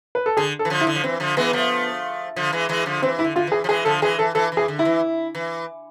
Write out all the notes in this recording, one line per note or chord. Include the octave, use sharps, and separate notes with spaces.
B4
A4
D3 G#4
A4
E3
D3 F3
E4
D3
F3
E3 C4
D3 F3
E3 G#3 B3
F3 A3
D3 F3
E3 G#3
E3 G#3
D3 F3
E3 C4
E4
D3
D3 F4
E3 G#4
F3
E3 G#3 G#4
D3 F3 A4
E3 G#3 G#4
E3 A4
E3 A4
E3
G#4
D3
E4
E3
E3